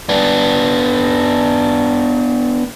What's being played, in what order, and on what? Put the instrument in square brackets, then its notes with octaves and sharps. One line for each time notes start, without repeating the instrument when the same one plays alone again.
[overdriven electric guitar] B3 D4